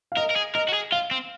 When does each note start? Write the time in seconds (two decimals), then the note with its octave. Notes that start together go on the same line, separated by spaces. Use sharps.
0.12 F5
0.17 A#4 D#5
0.31 A#4
0.36 G#4
0.55 A#4 D#5
0.68 F#4
0.73 G#4
0.92 F4 F5
1.11 C4